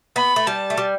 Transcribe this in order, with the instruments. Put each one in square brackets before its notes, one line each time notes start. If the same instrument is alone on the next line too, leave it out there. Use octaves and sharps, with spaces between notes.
[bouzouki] B3 [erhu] B5
[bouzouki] A3
[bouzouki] G3 [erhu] A5
[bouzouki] A3
G3